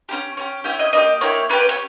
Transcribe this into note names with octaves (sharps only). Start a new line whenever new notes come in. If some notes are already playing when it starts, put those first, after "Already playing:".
C#4 E4 G4
C#4 E4 G4
C#4 E4 G4 G5
D#5
A#3 E4 G4 D#5
A#3 E4 G4 C#5
C#4 G4 B4
B4
C#5